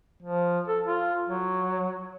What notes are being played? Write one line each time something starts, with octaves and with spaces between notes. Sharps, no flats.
F3
A4
F4
F#3